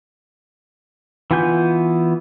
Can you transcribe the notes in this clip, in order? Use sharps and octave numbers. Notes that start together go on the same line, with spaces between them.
E3 B3 F4 G#5 G6